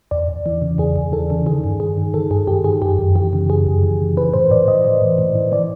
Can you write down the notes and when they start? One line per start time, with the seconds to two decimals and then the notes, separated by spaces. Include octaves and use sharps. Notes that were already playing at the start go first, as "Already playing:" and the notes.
0.11 E2 D5
0.28 E2
0.46 E3
0.62 C#3
0.78 E2 G#4
0.96 E2
1.12 E3 A4
1.30 C#3
1.46 D#3 G#4
1.64 G2
1.80 G2 G#4
1.98 D#3
2.14 D#3 A4
2.31 G2 G#4
2.47 G2 G4
2.64 D#3 G#4
2.82 F#2 G4
2.99 F#2
3.15 E3 G4
3.33 C#3
3.49 F#2 G#4
3.67 F#2
3.83 E3
4.00 C#3
4.17 E3 B4
4.33 A2 C5
4.50 A2 D5
4.68 E3 D#5
4.84 E3
5.02 A2
5.18 A2
5.35 E3
5.52 E3 D5